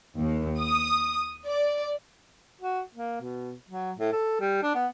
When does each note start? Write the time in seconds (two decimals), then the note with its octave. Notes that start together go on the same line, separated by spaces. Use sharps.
0.19 D#2
0.60 D#6
1.47 D5
2.61 F#4
2.95 A#3
3.21 B2
3.69 F#3
3.98 A2
4.12 A4
4.40 G3
4.63 D4
4.75 B3